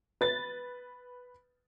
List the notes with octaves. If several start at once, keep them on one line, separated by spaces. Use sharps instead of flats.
B4 A6